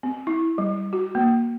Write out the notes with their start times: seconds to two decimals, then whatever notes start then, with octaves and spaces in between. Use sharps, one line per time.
0.03 C4
0.27 E4
0.58 G3
0.93 F#4
1.15 A#3